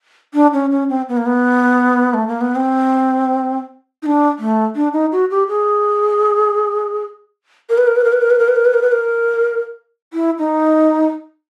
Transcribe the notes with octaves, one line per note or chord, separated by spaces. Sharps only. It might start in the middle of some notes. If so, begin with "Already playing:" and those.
D4
C#4
C#4
C4
B3
A#3
B3
A3
A#3
B3
C4
D#4
D4
A3
D4
D#4
F#4
G4
G#4
A#4
B4
A#4
B4
A#4
B4
A#4
B4
A#4
B4
A#4
B4
A#4
B4
A#4
E4
D#4